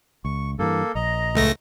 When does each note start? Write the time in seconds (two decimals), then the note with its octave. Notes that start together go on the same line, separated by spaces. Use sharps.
0.25 C#2 C#6
0.59 G2 E3 A#3 A4
0.95 A#1 D#5 A#5
1.35 C#2 A3 A#6